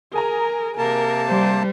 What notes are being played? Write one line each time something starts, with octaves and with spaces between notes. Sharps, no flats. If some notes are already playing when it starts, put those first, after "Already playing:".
G#4 A#4 G#5 A#5
C3 A#3 A#4 A5
G3 C5